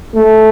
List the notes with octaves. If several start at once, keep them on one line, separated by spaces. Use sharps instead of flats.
A3